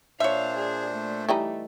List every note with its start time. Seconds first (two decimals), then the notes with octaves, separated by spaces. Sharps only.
0.20 A#2 D4 C5 C#5 E5 F5
0.58 G#4
0.92 A3
1.29 E3 G3 D#4